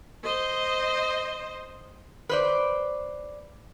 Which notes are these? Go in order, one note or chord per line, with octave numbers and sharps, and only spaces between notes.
C5 D#5
B4 C5 D5